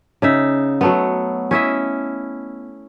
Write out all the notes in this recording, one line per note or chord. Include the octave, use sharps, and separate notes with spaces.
C#3 D#4 E5
F#3 A3 B3
C#4 E4 D#5 E5